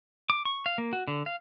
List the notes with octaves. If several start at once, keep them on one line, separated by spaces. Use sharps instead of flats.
D6
C#6
F5
A#3
F#4
D3
F5